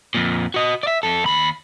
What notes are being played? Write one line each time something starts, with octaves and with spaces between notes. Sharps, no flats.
F2 A#2
F#4 D#5
D5 E5
F2 A4
D#2 B5